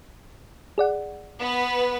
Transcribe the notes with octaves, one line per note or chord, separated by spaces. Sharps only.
G#4 D5 F#5
B3 B4